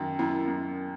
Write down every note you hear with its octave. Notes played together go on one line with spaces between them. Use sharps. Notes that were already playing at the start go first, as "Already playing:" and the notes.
Already playing: F#2 D#3
F#2 E4
F#2